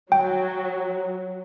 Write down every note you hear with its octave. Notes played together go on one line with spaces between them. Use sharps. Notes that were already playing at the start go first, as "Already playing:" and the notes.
F#3 G5